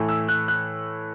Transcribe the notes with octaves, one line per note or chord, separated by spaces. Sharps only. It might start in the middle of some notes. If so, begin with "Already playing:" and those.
Already playing: A2 E3 A3
E6
F#6
F#6